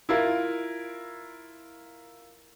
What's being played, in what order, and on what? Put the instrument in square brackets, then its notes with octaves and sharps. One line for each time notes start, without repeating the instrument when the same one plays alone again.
[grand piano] E4 F4 A#4